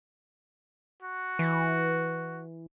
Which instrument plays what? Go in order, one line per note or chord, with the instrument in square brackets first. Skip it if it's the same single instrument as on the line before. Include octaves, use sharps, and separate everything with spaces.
[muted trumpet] F#4
[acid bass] E3